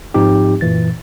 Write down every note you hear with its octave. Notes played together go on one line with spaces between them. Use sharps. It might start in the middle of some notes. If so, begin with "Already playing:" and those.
G#2 F3 C4 D#4 G4
F#2 A#2 E3 A6